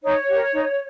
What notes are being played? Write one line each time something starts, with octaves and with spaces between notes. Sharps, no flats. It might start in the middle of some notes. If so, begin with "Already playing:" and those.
D#4 C#5
G4 A#4
D#4